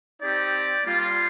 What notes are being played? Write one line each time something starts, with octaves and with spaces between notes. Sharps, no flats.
C4 D#4 G4 D5
G3 A#3 F4